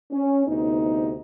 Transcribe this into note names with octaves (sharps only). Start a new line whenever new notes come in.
C#4
D2 C3 B3 D#4